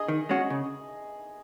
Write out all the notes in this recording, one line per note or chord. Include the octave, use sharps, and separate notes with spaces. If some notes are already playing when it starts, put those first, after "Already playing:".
Already playing: G#4 D#5 D#6
D#3
G#3 C#4 F#4
C#3